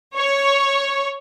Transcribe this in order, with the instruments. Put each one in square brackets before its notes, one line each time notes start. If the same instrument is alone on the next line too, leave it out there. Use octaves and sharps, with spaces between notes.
[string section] C#5